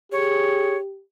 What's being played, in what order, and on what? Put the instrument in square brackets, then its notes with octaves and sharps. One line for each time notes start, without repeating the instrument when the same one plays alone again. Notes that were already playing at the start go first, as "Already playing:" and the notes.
[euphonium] G4 [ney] G#4 [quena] C#5